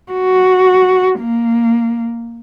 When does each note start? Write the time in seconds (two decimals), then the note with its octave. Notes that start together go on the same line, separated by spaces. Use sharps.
0.12 F#4
1.20 A#3